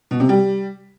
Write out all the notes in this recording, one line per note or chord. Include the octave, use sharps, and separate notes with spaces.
B2
C3
G3